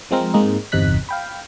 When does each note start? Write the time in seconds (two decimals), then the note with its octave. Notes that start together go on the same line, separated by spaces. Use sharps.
0.11 F3 G#3 C4 A#4
0.34 G#2 G#3 A#3 C4 D#4
0.72 G1 E2 C3 D#4 F#6 B6
1.09 F5 G5 B5